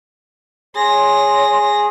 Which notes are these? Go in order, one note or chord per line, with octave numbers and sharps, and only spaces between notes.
G#4 C#5 C6 A#6